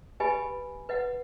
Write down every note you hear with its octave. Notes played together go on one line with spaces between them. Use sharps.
G4 B4 D#5 G#5 B5
B4 D#5 F#5